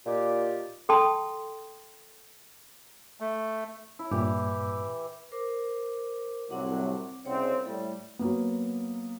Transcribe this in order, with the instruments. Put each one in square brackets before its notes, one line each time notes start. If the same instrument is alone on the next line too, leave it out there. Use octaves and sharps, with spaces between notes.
[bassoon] A#2 [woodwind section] D#4 F4 G4
[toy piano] A4 G5 A5 C6 D#6
[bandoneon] A3
[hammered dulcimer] E4
[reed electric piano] G2 A#2 [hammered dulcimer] E3 G4
[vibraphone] A#4 C5 D6
[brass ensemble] C2 A2 F#3 [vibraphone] C4 F#5 D6
[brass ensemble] C2 C#3 C4 [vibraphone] C#5 F#5
[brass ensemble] A2 G3 [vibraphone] A4
[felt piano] F#3 A#3 B3